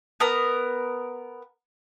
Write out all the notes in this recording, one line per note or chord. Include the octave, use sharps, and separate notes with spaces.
B3 A#4 A#5